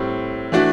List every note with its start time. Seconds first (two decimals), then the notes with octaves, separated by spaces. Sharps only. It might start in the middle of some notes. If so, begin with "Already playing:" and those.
Already playing: A2 G3 C4
0.52 E3 A3 D4 F#4